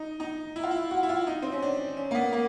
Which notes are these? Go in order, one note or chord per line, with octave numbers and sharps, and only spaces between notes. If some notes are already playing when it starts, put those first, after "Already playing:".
Already playing: D#4
D#4
E4
F4
E4
F#4
E4
F4
D#4
C4
C#4
D4
C#4
A#3
B3
A#3